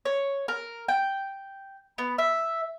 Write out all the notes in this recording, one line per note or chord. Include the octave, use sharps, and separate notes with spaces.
C#5
A#4
G5
B3
E5